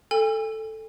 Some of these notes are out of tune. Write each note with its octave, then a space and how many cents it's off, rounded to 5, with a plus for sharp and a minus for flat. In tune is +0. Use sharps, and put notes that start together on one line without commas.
A4 +0 G#5 -40 E6 +45